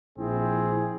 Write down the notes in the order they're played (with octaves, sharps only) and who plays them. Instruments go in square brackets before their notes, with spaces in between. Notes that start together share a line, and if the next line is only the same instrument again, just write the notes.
[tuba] A#1 [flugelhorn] C4 [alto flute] E4 [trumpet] G#4